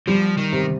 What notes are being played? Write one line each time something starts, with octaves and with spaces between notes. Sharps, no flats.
F3 G3
D#3
C3